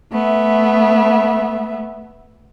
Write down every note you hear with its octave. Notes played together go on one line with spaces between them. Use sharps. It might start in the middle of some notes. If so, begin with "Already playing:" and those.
A3 B3 E5